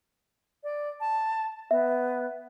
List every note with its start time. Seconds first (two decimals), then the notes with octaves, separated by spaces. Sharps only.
0.64 D5
1.00 A5
1.71 B3 E5